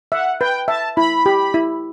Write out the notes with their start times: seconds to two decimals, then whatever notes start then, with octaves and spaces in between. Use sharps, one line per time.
0.12 E5 F#5
0.40 B4 G5
0.68 E5 A5
0.96 E4 B5
1.26 G4
1.54 E4